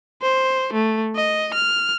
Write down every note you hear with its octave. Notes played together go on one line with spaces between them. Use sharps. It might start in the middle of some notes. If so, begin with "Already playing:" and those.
C5
A3
D#5
F6